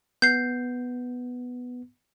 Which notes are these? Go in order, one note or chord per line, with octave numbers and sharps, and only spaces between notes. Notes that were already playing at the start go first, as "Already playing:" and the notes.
B3 G6 C7